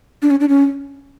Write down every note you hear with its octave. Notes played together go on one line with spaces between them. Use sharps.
D4
C#4
D4
C#4